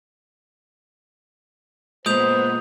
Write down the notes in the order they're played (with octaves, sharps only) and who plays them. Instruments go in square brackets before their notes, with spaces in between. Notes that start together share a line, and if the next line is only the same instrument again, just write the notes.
[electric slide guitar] A#2 G#3 [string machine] B3 [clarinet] C5 [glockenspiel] D#6 G6 F7